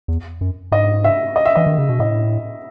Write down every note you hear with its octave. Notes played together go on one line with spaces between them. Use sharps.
E2
F#2
G#2 D#5
E5
D#5
E5
E3 D#5
D#3
C#3
B2
A2 D#5